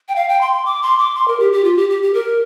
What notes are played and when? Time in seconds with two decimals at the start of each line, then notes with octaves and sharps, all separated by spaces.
0.09 G5
0.16 F5
0.29 G5
0.41 C6
0.53 C6
0.65 D6
0.82 C6
0.99 D6
1.15 C6
1.28 A#4
1.40 G4
1.52 G4
1.64 F4
1.77 G4
1.90 G4
2.02 G4
2.14 A#4